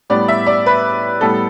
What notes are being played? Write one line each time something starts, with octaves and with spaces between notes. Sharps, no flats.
A2 G3 B3 D5
E5
D5
B4
A2 G3 B3 A4